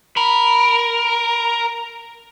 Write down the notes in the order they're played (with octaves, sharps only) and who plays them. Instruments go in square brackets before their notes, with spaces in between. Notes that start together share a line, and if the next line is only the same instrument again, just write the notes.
[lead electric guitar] A#4 [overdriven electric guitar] B5